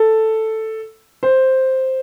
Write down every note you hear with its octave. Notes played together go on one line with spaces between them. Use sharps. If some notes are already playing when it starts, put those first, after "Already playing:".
Already playing: A4
C5